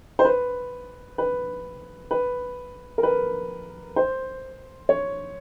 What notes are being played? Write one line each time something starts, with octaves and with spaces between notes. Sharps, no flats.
C5
B4
B4
B4
A#4
B4
C5
C#5